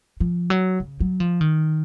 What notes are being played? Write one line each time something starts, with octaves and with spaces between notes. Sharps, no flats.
F3
F#3
C#3
F#3
F3
D#3